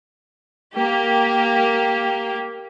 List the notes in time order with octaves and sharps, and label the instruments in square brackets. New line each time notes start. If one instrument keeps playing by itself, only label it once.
[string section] A#3 G4